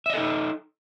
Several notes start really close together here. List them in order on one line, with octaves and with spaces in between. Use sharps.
E5 D#5 A4 D#4